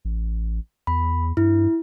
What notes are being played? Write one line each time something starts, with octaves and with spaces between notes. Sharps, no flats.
A1
E2 B5
G2 E4